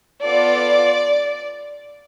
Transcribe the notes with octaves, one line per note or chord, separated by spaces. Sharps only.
B3 F4 A4 D5